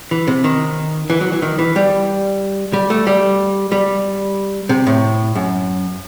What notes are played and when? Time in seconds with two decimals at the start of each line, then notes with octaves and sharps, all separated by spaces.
0.11 E3
0.28 C3
0.44 D#3
1.10 E3
1.21 F#3
1.32 E3
1.42 D#3
1.59 E3
1.76 G3
2.73 G3
2.90 A3
3.07 G3
3.72 G3
4.69 C3
4.87 A2
5.35 F#2